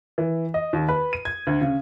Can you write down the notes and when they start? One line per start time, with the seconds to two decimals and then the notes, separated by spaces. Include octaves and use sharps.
0.18 E3
0.54 D#5
0.73 D#2
0.89 B4
1.13 D#7
1.25 G#6
1.47 D2
1.61 C#3